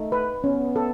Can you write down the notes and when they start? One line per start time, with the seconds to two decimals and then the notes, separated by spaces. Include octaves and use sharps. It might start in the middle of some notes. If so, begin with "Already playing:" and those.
Already playing: A3 D#4
0.12 B4
0.44 B3 C#4
0.76 A4